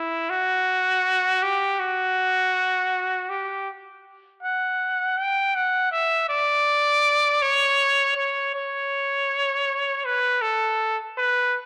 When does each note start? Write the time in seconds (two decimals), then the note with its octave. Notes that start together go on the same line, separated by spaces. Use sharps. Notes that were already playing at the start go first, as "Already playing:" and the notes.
Already playing: E4
0.30 F#4
1.43 G4
1.80 F#4
3.30 G4
4.43 F#5
5.18 G5
5.56 F#5
5.92 E5
6.29 D5
7.42 C#5
8.17 C#5
8.55 C#5
10.05 B4
10.42 A4
11.18 B4